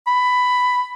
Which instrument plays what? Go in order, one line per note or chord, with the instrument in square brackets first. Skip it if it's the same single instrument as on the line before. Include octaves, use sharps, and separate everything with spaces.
[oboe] B5